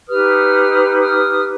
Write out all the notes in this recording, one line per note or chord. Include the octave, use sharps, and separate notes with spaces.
D#4 G4 B4 D#6 F6
D#6 F6